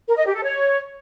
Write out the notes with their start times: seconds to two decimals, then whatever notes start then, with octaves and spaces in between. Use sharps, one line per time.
0.07 A#4
0.17 D#5
0.26 G4
0.35 A4
0.44 C#5